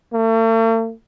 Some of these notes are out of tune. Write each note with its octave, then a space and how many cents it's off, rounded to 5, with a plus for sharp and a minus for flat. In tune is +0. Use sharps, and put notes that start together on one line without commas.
A3 +45